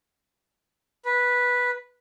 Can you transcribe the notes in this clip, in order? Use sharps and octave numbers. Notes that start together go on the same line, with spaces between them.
B4